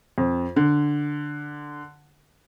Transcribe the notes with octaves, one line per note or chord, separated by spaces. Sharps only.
F2
D3